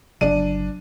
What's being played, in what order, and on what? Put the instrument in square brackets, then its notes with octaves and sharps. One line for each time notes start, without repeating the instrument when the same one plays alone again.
[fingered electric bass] G1 C#3 F#3 [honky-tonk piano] D4 D#7